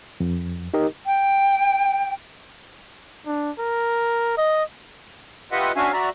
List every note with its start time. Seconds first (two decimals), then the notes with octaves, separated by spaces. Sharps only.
0.20 F2
0.74 D#4 G4 A#4 D#5
1.06 G5
3.26 D4
3.59 A#4
4.38 D#5
5.52 F4 G4 B4 D#5 E5 F#5
5.76 C#4 D4 F#4 E5 F5 G#5
5.93 F#4 D5 E5 A#5